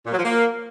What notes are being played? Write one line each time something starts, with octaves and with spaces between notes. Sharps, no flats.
A#2
F#3
F3
A#3